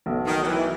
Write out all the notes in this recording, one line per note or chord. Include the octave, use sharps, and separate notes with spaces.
B1 B2 A3
D#3
F#3
E3